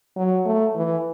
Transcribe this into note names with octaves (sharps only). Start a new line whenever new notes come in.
F#3
A3
E3